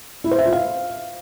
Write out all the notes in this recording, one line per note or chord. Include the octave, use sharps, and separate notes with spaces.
E4
C5
E5
F4
F5